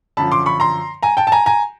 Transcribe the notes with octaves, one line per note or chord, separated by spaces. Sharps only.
F#2 D3 F3 A5 B5
C6 D6
B5 C#6
A#5 C6
G#5 A#5
G5 A5
A5
G#5 A#5
G#5 A#5